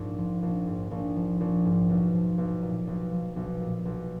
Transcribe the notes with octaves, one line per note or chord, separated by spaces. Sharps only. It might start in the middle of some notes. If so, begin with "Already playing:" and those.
Already playing: A#1 G#2
F3
A#1
G#2
A#1
F3
A#1
G#2
B1
F3
B1
A#2
B1
F3
B1
A#2
B1